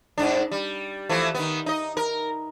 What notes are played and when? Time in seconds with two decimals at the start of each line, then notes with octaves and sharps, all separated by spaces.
0.18 G#2 D4
0.51 G3
1.09 E3 F3 A3
1.35 D#3 B3
1.66 D#4 D#5
1.97 A#4